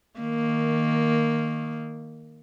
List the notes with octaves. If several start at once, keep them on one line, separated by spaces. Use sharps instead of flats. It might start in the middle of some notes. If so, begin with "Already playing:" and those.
D#3 A#3